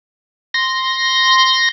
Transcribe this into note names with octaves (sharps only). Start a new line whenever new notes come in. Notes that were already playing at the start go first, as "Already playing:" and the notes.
C6 A#6